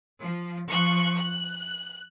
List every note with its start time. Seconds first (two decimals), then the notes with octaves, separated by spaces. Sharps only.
0.21 F3
0.68 F3 C#6 F#6
1.18 F#6